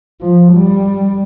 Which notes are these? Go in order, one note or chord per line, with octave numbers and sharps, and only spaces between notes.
F3
G3